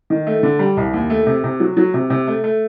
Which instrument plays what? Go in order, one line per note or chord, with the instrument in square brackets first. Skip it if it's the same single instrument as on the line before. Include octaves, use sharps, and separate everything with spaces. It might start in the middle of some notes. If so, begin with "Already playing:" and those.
[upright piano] D#3
A3
D3
G3
C2
D#2
A3
C3
C3
F#3
F#3
C3
C3
A3
A3